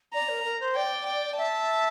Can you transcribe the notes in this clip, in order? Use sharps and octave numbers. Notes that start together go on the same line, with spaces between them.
D5 A#5
A#4
A#4
C5
D5 G5
G5
E5 A5